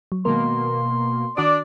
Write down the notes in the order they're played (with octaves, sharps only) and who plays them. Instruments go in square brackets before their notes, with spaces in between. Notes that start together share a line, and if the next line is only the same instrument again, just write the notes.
[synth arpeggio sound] F#3
[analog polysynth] B2 A#3 [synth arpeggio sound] D#3 G#3 A#4 [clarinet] C6
[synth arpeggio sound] D#3 F#4 D#6 [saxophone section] D4 D5